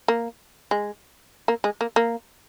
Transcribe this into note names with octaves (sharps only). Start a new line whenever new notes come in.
A#3
G#3
A#3
G#3
A#3
A#3